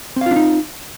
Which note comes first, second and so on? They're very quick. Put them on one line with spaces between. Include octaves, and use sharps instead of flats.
C4 F5 F4 D4 D#4